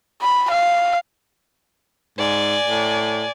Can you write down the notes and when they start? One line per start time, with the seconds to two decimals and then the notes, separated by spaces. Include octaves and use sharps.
0.22 B5
0.51 F5
2.18 G#2 D5 G#5
2.64 A2